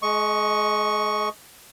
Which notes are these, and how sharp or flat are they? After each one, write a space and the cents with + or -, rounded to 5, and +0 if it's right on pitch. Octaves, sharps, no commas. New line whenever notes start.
G#3 +35 D#5 +0 C#6 +0